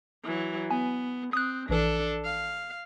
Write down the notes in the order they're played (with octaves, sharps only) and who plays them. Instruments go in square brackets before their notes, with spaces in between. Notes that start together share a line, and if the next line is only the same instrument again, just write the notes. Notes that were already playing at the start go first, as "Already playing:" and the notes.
[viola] E3 F#3
[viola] B3 [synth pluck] G#5
[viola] C4 [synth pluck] D#6 F#6
[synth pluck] A#1 E3 [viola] D4 A4
[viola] F5